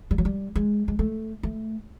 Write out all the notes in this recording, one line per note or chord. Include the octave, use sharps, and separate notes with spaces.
G3
F#3
G3
G#3
G#3
A3
A3